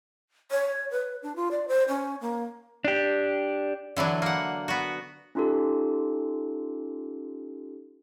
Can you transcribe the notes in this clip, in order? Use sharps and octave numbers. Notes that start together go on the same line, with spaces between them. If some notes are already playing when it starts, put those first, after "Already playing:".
C#5
B4
D4
F4
D5
C5
C#4
A#3
D4 G4
D3 E3 F#3 D4
A#3 F#5
B3 F#4
C#4 D#4 F4 G4 A4